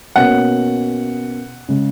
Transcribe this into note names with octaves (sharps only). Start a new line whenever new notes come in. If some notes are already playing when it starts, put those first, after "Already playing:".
B2 A#3 C#4 F#4 F#5
C#3 G#3